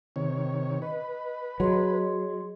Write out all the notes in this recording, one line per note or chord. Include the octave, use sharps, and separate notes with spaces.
C3 D#3 C#5
B4 D#5
F#3 G#4 D#5 C6